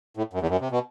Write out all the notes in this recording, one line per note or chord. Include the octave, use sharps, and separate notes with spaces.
A2
F#2
E2
F#2
C3
B2